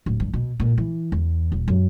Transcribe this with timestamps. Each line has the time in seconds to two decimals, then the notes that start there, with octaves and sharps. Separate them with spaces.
0.06 D1
0.20 G2
0.33 B2
0.60 A#2
0.78 E3
1.12 E2
1.52 D#1
1.68 F#2